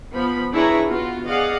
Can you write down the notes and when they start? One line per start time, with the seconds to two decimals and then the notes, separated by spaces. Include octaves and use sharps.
0.14 F3 B3 B5
0.53 D4 E4 G#4 B4 C#5 A#5
0.88 B3 F4 F#4
1.27 G#4 D5 D#5 F5 F#5